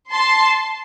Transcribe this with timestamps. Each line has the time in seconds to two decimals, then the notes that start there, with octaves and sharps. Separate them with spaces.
0.12 A5 C6